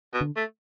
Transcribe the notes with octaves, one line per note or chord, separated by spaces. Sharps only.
B2
D3
A3